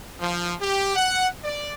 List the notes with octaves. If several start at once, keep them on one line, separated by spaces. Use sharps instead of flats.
F3
G4
F#5
D5